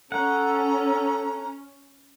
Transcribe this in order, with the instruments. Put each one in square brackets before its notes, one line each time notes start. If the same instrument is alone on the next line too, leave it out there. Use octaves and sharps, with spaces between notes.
[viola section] C#4 [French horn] A4 [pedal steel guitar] F#5 [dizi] A#5